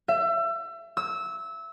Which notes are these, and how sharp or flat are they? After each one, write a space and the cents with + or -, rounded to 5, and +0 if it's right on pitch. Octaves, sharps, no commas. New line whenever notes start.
E5 +30
E6 -20